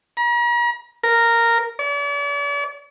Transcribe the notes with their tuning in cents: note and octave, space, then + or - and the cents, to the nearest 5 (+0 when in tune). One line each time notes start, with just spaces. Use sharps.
A#5 +45
A#4 -5
D5 -45